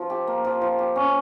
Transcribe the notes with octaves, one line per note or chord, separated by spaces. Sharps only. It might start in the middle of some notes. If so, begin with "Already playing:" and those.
Already playing: F3
G4
A#3
F3
F3
G4
C#4